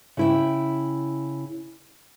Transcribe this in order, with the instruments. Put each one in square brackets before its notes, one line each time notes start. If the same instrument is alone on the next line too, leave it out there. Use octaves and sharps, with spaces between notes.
[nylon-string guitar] C#3 E4 G5